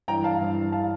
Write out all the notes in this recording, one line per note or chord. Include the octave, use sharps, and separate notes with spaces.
G2 E3 G5 A#5
F5 A5
G2 E3
F5 A5
E3